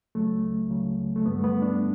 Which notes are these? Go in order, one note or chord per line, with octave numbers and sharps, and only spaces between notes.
C#2 C#3 F#3 A3
C#2 C#3 F#3
A3
G2 D3 G3 B3
A3
B3
D4